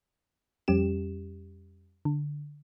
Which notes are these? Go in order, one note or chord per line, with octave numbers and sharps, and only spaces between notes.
F2 G3 C#4 G4 E7
D3